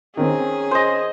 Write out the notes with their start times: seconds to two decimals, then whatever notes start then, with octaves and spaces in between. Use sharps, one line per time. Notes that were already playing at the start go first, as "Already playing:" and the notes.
0.17 D#3 C4 C#4 G#4
0.71 C5 D#5